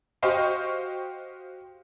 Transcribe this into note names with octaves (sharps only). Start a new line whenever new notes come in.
F#4 G4 C5 D#5 F5 C#6